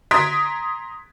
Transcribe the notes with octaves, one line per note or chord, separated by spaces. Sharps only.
A#5 C6 D#6 G#6 B6 D7